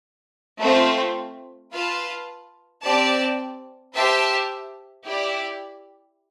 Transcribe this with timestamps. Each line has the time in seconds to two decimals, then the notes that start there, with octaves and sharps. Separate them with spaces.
0.60 A3 C4 F4
1.71 F4 B4 F5 A5
2.82 C4 G4 D5 A5
3.94 G4 C5 E5 A5
5.05 E4 G4 D5